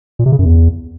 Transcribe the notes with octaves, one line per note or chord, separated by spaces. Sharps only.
A#2
C3
C#3
F#2
E2